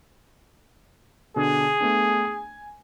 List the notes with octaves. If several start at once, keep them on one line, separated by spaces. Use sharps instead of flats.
B2 D3 D4 G#4
A3 B3 D4
G#5